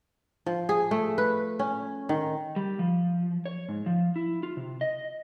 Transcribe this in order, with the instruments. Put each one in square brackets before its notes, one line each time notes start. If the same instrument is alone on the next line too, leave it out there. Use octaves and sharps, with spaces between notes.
[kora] F3
G#4
A3
B4
C#4
D#3
[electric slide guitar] G3
F3
C#5
G#2
F3
E4
F4
C3
D#5